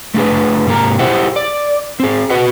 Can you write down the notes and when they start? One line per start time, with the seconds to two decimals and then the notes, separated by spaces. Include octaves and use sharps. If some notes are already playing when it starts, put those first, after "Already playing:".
0.14 A3 D4 G#4 B4
0.67 G#2 C3 A#3 A#4 A#5
0.99 E4 G4 G#4 C5 E5 F#5
1.36 D5
2.00 C4 G#4
2.30 F#4 B4 D#5 F#5